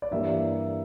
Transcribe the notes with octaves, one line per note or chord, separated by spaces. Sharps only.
D5
G2 E3 G3 A#3 E5